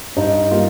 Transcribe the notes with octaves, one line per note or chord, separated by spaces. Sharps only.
G2 D#4
G3 A#3 F4